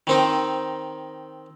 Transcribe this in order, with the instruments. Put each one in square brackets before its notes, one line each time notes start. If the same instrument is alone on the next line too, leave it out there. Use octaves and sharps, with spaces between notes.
[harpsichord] D#3 C4 D#4